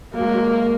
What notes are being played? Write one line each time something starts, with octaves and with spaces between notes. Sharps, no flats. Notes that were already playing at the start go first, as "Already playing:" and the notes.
F#3 A#3
G#3
F#3